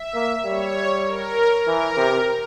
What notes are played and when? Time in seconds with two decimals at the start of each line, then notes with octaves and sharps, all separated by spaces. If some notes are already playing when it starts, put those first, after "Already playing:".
Already playing: E5
0.14 A#3
0.45 G3 C#5
1.06 A#4
1.67 E3 A#4
1.97 C3